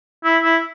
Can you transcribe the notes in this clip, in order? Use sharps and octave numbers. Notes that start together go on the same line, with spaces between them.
E4
E4